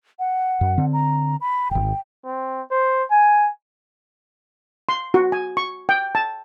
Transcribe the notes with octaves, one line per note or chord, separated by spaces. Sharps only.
F#5
F#2
D3 C4
A#5
B5
D#1 G#1 G5
C4
C5
G#5
C6
F#4
G#5
C#6
G5
A5